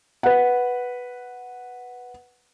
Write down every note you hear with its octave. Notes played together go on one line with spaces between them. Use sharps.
B4 F#5